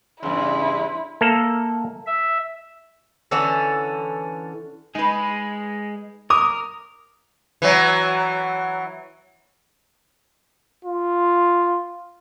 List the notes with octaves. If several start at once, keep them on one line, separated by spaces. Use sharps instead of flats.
E2 G2 C#3 E4 C6
A#3 A4 E5 F5 A#5
E5
D3 E3 C#4 A4
G#3 D#4 G#4 B4
A#4 D6 D#6
E3 F#3
F4